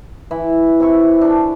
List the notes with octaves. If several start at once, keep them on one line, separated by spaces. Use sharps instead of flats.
E3 B5
C3 E4 C#6
D4 A4 B4